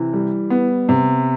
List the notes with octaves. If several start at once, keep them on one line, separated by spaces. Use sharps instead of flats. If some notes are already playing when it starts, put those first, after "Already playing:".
Already playing: C3 E3
G3
B3
C3